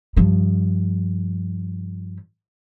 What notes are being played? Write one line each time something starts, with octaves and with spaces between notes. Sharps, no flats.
G2 F3